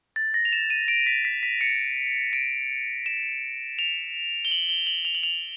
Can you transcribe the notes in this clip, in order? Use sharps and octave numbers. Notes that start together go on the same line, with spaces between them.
A6
A#6
F7
E7
D#7
D7
B6
B6
B6
C#7
D7
E7
F7
G7
F#7
G7
F#7
F7
F#7
F7